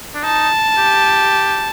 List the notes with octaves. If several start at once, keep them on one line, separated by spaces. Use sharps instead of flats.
D4
D#4 A5
G4